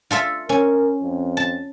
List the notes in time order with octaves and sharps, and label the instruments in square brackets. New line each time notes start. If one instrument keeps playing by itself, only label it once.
[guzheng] F4 A4 E5
[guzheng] C#4 [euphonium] A#4
[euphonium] F2
[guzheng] A5